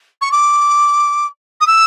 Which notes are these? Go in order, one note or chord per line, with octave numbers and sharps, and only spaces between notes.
C#6
D6
D#6
E6